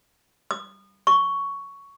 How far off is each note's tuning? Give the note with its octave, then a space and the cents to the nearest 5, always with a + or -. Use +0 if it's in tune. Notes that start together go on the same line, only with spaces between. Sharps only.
D#6 -30
C#6 +10